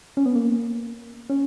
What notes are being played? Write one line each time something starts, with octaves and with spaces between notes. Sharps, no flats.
C#4
B3
A#3
C#4